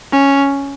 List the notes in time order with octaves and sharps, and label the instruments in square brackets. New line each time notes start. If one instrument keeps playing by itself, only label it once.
[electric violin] C#4